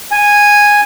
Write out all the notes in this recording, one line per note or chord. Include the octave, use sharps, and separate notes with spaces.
G#5